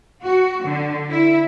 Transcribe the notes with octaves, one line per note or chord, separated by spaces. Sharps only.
F#4
D3
E4